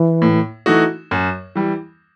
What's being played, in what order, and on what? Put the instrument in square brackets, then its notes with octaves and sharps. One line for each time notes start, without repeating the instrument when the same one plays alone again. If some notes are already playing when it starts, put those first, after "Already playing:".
Already playing: [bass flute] E3
[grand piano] A2
E3 A3 D#4 F#4
F#2
E3 G3